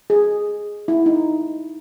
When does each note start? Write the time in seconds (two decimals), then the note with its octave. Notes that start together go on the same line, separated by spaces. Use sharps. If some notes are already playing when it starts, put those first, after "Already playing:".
0.10 G#4
0.88 E4
1.06 D#4